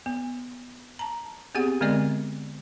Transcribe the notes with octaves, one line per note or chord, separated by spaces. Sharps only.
B3
A5 A#5
B3 C4 G4 G#4 F#5
D3 G#3 B3 C4 D5 D#5